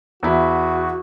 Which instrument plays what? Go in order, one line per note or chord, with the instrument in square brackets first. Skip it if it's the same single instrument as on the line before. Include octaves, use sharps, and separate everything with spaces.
[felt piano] E2 E4 [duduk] F#4